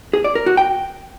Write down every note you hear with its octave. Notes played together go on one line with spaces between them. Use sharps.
G#4
D5
A#4
F#4
G5